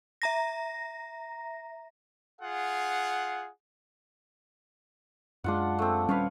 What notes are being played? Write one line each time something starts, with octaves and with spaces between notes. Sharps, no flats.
E5 A#5 A#6
F4 G#4 F#5
F#2 G#3 D4 F4 F#5
A3 C4
D#1 G3 C#4 B4 C#5 F5